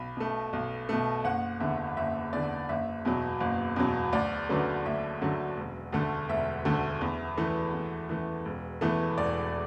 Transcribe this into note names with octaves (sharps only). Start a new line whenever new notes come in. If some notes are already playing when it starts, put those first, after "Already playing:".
Already playing: B1 B5
B2 A3
B1
B2 A3
F#1 F#5
E2 D3 E5
F#1 E5
E2 D3 D5
F#1 E5
E2 B2 F#3
F#1
E2 B2 F#3
D2 D5
D3 F#3 A3 B4
D2 E5
D3 F#3 A3
E1
D2 D3 A3
E1 E5
D2 D3 A3
E2
E3 A3
E2
E3 A3
E1
E2 E3 A3
E1 D5